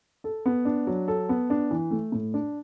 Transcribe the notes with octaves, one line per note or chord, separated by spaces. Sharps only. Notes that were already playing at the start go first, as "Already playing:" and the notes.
A4
B3
D4
F#3
A4
B3
D4
E3
A3
A2
D4